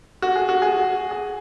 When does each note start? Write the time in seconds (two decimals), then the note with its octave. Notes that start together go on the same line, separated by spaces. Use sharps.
0.22 F#4
0.36 G#4
0.49 F#4
0.62 G#4
0.74 F#4
1.11 G#4